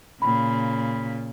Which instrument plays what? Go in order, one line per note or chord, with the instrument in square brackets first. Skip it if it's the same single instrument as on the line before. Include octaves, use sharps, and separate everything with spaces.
[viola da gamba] A#2 C#3 [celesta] B5